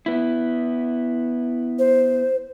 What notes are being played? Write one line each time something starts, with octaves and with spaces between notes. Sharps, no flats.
B3 E4
C5